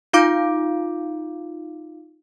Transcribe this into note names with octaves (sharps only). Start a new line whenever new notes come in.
D#4 F4 F5 D6 G6 D7